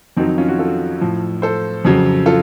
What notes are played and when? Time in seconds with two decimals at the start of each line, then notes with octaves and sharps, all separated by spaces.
0.17 F2 D#3 F#3 C4 D#4
0.38 C#4 F4
0.48 F#4
0.59 F4 A4
1.01 A2 F3
1.42 A4 C5
1.85 F2 C#3 F#3
2.26 F4 A4